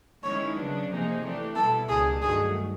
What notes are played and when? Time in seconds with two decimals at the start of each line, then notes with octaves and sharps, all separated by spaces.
0.23 D#3 G#3 C#4 E4 C#5
0.56 C#3 F#3 B3 D4
0.89 C3 F3 A#3 D#4 G#4
1.23 E3 A3 D4 G4
1.56 B2 G3 B3 E4 A4
1.89 C#2 B2 G3 A#3 D4 G#4
2.22 G2 D#3 F#3 A3 G#4